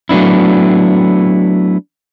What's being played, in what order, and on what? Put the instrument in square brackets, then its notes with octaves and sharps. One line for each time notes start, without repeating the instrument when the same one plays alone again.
[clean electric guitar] F#3 A3 B3 D4 E4